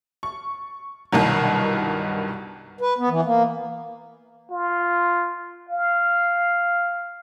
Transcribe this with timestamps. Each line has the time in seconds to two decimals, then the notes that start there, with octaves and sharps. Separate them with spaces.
0.23 C#6
1.12 C2 G2 B2 D#3 F#3
2.81 B4
2.98 B3
3.09 E3
3.25 A#3
4.50 F4
5.69 F5